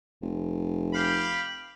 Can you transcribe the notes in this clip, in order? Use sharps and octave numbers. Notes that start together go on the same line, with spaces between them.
F1
G4 F5 B5